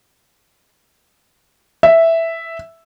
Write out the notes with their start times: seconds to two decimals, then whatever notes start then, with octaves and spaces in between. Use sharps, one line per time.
1.83 E5